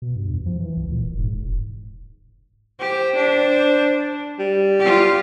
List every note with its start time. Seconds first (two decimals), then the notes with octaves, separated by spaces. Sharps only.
0.02 B2
0.16 G2
0.28 E2
0.46 F3
0.60 E3
0.77 C#2
0.92 A#2
1.04 E1
1.18 G#2
1.34 E1
2.80 G4 C5
3.16 D4
4.39 G3
4.80 F4 G4